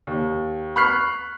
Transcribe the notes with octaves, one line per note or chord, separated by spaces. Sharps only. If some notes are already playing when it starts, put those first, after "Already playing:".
D#2
B5 C#6 F6 F#6 B6 C7